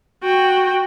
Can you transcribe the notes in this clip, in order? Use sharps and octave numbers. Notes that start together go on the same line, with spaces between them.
F#4 G5